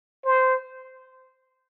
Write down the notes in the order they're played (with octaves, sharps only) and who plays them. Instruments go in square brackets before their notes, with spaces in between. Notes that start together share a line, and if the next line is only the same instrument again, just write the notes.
[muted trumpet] C5